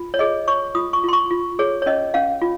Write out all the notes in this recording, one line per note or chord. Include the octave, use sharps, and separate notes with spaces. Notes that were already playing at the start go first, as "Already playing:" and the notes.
Already playing: F4
C#5
G#4 D#5
C#5 C#6
F4 D#6
C#6
F4 C6
C#6
F4
G#4 C#5
C#5
C#4 D#5
C#4 F5
F4